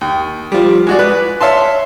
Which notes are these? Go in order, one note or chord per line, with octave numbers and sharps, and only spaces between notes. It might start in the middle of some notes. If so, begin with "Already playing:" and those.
D#2
F3 G3
G#3 F#4 D5
B4
C#5 E5 F5 A5 C6